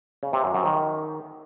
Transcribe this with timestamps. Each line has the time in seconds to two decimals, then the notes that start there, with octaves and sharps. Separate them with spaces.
0.23 C#3
0.33 C3
0.44 F#2
0.54 F#2
0.65 D#3